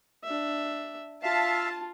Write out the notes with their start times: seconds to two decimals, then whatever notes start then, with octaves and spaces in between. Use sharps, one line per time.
0.24 D4 E5
1.23 F4 E5 F5 A5